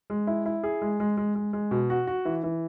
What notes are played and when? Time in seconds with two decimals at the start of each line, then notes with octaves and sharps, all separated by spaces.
0.10 G#3
0.27 E4
0.46 E4
0.63 G#4
0.82 G#3
1.00 G#3
1.17 G#3
1.35 G#3
1.53 G#3
1.71 B2
1.90 F#4
2.07 F#4
2.25 E3
2.43 E3